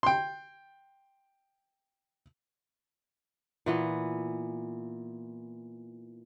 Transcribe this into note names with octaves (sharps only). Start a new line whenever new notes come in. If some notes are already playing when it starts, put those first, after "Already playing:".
G5 C6
A#2 E3 B3